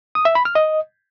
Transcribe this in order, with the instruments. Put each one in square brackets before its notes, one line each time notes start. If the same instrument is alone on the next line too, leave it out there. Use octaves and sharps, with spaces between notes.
[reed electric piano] D#6
E5
B5
F6
D#5